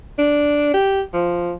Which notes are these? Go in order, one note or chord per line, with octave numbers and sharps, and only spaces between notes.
D4
G4
F3